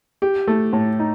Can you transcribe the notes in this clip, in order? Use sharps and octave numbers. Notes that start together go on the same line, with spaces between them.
G4
A3
A2
D#4